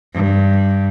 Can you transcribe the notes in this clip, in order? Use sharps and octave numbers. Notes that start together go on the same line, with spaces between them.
G2